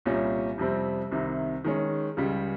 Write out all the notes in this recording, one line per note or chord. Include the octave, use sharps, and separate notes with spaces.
C2 A#2 G3 C#4
F2 C3 G3 C4
C2 C3 D#3
D#3 G#3 C#4
C#2 C#3 G3